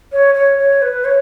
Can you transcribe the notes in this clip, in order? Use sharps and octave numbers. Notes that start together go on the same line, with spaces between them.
C#5
C#5
C#5
B4
C#5